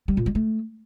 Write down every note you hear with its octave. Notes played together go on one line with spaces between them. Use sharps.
G3
A#2
G3
A3